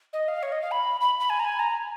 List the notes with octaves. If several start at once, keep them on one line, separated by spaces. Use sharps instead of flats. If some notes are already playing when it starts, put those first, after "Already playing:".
D#5
F5
C#5
D#5
F5
B5
B5
B5
G#5
A#5
G#5
A#5